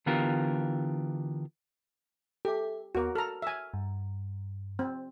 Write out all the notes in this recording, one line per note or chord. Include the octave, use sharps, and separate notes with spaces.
D3 E3 B3 F4 G4 A#4
G4 A4 E5
D#2 B3 F#4 A#4 D6
A4 A#5 F6
E5 G#5
G2
C4